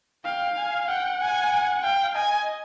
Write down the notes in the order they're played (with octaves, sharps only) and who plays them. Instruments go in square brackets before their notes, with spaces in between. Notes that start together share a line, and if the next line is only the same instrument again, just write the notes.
[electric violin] F5 [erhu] G5
[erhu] G#5
[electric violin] F#5 [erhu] G5
[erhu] G#5
[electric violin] F5 [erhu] G5
[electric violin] D#5 [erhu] G#5